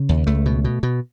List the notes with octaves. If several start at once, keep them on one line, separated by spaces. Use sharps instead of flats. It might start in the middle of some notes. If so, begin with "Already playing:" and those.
Already playing: C#3
D#2
C#2 A3
B2
B2
B2